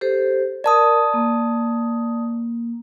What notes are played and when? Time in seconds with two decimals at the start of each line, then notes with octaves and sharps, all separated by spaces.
0.01 G4 A4 C5
0.64 A#4 D5 A5 D#6
1.14 A#3